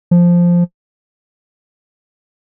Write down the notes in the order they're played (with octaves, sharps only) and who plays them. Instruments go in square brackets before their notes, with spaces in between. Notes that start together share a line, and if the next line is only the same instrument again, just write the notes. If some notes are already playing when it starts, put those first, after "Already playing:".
[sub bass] F3